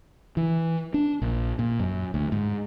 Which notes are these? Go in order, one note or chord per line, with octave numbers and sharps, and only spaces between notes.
E3
D4
A#1
A#2
F#2
D2
G#2